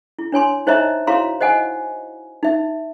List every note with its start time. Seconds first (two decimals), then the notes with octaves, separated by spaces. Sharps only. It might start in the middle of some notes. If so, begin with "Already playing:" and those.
0.19 E4
0.32 D4 C#5 G#5 C6
0.67 D#4 C5 C#5 D#5 E5 A#5
1.07 E4 F#4 C#5 F5 A#5 C6
1.41 C5 D#5 F#5 G#5
2.43 D#4 E5